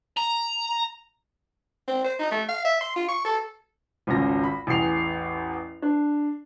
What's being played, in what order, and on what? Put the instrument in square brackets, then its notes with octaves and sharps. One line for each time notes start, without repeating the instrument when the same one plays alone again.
[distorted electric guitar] A#5
[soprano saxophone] C4
C5
D#4
A3
F5
E5
C6
F4
C#6
A4
[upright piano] G#1 C#2 C#4 A#6
B5
A1 E2 G#4 C7 F7
D4